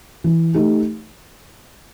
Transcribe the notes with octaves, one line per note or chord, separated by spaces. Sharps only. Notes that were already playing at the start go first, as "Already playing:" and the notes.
E3
A3 D#4 G4